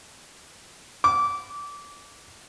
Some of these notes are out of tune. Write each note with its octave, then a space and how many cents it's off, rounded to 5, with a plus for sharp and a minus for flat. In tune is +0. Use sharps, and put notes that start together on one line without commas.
D6 -20